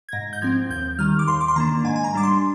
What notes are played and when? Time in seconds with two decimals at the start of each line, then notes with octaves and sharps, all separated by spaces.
0.09 G#6
0.12 G#2 A#6
0.33 G6
0.42 F3 C4 G#6
0.70 D#2 G6
0.99 D#3 G3 F6
1.19 D6
1.28 D#2 C6
1.41 D6
1.48 C6
1.56 D#3 A#3 D4 A#5
1.84 G#2 G#5
1.96 G#5
2.04 A#5
2.14 G3 D4 D6
2.23 C6